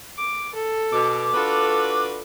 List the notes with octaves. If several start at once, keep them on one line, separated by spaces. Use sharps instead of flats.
D6
A4
B2 D6
D4 F4 F#4 A4 B4